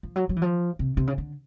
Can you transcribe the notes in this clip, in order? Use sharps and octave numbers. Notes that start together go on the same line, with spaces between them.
F3
F#3
F#3
E3
F3
C3
C3
C#3
D3